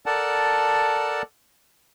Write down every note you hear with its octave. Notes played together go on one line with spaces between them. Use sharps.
A4 A#4 D5 F#5 A5